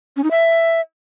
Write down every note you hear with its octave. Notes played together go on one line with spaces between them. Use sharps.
C#4
D#4
E5